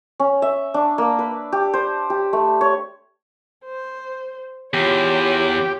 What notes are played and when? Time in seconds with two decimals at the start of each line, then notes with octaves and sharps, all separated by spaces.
0.20 C#4
0.42 E5
0.74 D4
0.98 A#3
1.19 B4
1.52 G4
1.74 C5
2.10 G4
2.33 A3
2.61 C#5
3.65 C5
4.74 E2 F4 G4 C#5